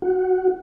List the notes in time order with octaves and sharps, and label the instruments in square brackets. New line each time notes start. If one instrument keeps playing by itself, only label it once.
[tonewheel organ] F#4